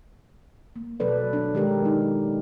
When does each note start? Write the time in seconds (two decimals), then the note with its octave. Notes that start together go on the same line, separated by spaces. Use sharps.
0.76 A#3
1.00 B2 F#3 A4 B4 D5
1.33 D4
1.53 D#3 G#3 G4 A#4
1.85 D#4